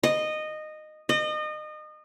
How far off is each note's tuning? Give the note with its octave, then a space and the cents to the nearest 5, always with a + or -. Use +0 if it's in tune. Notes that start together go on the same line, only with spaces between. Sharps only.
D#5 -15
D#5 -30